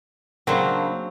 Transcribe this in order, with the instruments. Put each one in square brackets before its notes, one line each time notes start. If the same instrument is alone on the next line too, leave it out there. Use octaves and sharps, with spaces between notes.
[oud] C#3 A#3 D4 [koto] F#3 C4